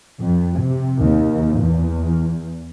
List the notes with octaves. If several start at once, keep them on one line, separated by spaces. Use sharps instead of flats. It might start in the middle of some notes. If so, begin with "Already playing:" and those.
F2
C3
D#2
E2